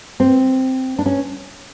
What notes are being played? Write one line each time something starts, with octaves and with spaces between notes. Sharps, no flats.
C4
D4
C#4